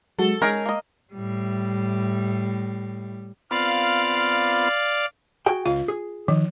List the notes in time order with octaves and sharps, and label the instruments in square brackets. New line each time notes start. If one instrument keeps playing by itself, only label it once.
[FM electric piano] F#3 G#3 F#4 [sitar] A4
[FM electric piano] G#3 [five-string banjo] C#4 D#4 G#4 [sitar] A#4
[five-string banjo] A#3 D#5
[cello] A2 G3
[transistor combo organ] B3 C4 F4 [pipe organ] D5 F5
[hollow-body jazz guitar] F#4 G#4 G5
[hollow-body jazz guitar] C#2 F5 [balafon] F4
[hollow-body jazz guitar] G#4
[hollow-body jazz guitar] D#3 [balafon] F3